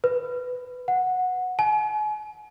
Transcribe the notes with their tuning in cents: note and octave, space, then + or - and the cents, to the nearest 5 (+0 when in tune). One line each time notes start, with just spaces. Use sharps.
B4 +15
F#5 -10
G#5 +40